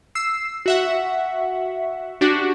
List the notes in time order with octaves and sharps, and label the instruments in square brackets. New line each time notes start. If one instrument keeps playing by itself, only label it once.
[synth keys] E6 C7
F#4 E5 F#5
D4 F#4 G4